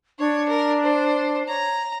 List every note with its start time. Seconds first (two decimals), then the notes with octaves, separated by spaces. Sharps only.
0.19 D4 C#5
0.48 A#4
0.83 C5
1.48 C#5 A#5